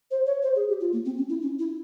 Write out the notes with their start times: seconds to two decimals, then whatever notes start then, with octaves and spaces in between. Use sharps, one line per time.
0.11 C5
0.26 C#5
0.43 C5
0.56 G#4
0.68 G4
0.80 F4
0.93 A#3
1.05 C4
1.18 C#4
1.29 E4
1.42 C#4
1.59 E4